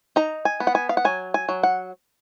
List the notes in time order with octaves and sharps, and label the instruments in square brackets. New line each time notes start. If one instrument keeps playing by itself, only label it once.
[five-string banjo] D#4 A#5
G#5
B3
F#5
G#5
F5
F#5
F#3 G#5
G#5
F#3
F#5